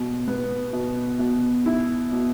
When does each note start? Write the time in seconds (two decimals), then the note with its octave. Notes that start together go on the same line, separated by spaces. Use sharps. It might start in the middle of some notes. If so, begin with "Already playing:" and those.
Already playing: B2
0.28 B3
0.73 B2
1.19 B2
1.66 E4
2.12 B2